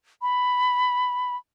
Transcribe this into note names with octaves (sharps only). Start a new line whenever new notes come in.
B5